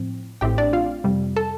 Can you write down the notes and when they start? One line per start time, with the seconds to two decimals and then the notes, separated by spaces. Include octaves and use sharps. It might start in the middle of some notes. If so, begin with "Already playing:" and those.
Already playing: A2 F3 C4
0.41 A1 A2 A3 C4 G4 G5
0.58 D4 D5
0.73 F4 F5
1.04 F2 C3 G3
1.36 A4 A5